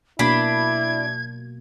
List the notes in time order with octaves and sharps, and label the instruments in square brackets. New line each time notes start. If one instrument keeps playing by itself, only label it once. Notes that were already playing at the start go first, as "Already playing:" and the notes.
[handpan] B2 A#3 [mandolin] D4 B5 [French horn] E4 [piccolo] G#6